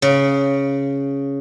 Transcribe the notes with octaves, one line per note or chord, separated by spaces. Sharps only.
C#3